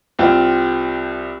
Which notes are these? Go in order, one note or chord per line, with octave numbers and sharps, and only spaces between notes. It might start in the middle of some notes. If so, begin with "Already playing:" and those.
C2 C4 F4